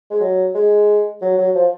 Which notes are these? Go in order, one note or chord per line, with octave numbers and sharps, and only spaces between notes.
G#3
F#3
G#3
F#3
F#3
F3